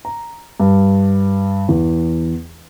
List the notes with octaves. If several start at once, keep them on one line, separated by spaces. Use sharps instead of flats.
A#5
G2
E2